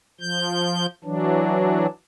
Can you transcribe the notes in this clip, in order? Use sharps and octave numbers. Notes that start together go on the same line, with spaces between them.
F3 G6
E3 F#3 D4